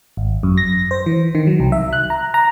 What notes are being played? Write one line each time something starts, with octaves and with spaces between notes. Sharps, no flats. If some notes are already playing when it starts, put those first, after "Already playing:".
G#1
F#2
A#6
C5
E3
D#3
F#3
C2
E5
F#6
A#5
A#5